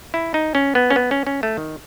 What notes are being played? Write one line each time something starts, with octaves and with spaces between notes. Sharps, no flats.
E4
D#4
C#4
B3
C#4
B3
C#4
C#4
A3
D#3